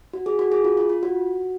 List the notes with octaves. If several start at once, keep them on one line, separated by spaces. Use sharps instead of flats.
F#4
G#4
F#4
G#4
F4
F4
F4
F#4